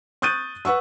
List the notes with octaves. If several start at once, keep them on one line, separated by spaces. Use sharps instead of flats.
C#6 D#6 F#6 G6 A6 D#7
B4 F#5 C#6 E6